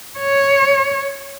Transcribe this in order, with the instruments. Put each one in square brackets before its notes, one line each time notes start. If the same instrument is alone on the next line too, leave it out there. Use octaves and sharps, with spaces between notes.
[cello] C#5